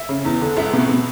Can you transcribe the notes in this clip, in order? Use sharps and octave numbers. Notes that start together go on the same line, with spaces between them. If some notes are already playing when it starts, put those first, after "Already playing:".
Already playing: E5
C#3
E2
D3
C#2 E5
B2
B2